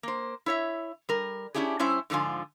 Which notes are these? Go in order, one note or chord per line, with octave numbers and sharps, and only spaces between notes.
A#3 C5
E4 C#5 E5
G3 A#4
C#4 D4 E4 G4 G#4
G3 C#4 E4 C5 E5
G#2 D3 F3 F4 G#5